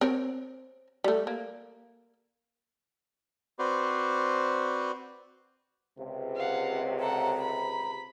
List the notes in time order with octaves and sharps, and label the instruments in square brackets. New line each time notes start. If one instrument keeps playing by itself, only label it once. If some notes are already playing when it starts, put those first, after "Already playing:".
[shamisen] C4 A#4 C#5
G3 A3
A#3
[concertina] C4 F#4 B4 C5 D5
[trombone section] C#2 C3
[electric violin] F5 F#5
[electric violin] A4 F#5 [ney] A#5
[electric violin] B5